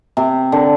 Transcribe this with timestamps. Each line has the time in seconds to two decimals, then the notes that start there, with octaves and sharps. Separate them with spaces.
0.17 C3
0.52 D3